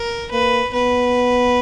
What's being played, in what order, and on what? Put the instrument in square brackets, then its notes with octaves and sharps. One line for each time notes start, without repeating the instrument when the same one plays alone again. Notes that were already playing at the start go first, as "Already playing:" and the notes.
Already playing: [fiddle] A#4
[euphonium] A#3 [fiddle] B4
[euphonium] B3 [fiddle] B4